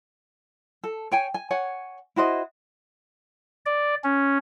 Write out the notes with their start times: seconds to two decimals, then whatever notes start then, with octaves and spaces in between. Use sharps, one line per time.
0.84 A4
1.12 C#5 G5 G#5
1.34 G#5
1.51 C#5 F#5 G#5
2.16 E4 F#4 C5 D#5
3.66 D5
4.04 C#4